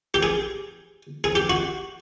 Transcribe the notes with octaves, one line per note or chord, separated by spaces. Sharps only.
G4
G#4
G#4
G4
F#4